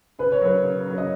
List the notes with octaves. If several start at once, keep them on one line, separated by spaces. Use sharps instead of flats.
C#3 B4
C#5
F#3 A#3 C#4 B4
C#3
F#3 A#3 C#4
D#5